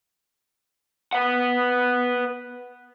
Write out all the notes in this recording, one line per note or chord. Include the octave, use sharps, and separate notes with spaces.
B4 F#5